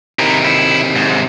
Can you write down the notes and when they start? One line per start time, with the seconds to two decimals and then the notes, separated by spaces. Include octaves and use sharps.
0.19 C3 D#3 E4 A#4
0.45 E4
0.96 G#2